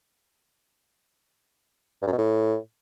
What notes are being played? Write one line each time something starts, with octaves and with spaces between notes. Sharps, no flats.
G2
F#2
B2
A2